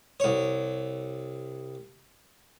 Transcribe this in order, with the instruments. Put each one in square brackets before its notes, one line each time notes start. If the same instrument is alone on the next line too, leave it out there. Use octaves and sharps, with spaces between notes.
[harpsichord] C2 C#5